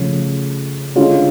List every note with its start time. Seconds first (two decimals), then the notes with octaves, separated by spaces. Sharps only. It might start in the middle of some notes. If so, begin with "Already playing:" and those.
Already playing: C#3 F3 A3 C#4
0.95 D3 G#3 C#4 F4